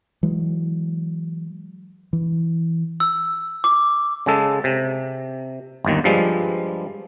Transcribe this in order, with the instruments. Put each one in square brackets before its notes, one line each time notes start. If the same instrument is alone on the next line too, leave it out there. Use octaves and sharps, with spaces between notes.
[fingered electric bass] E3 F#3 G#3
E3
[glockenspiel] E6
D6
[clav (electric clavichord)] C#3 G#3 A4
C3
G1 D#2 D#3
G2 F3 G3 G#3